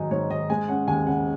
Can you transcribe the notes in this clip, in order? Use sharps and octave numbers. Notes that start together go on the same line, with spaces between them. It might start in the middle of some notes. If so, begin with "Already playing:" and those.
Already playing: G#2 D#3 F#3 D#4 G#5
G#2 C#5
D#3 D#5
G#3 G#5
C#4 F#5
D#2 G#5
C#3 F#5